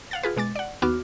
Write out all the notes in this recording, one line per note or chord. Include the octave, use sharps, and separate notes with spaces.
F5 F#5 A6
F4 G#4 B4
B2 G#3 D6 A6
D5 F#5
D#2 B3 F#4 D6 F6